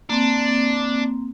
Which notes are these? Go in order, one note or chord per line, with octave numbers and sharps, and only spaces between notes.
A#3 C4 D4